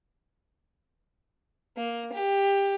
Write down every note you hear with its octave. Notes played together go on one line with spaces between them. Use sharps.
A#3
G4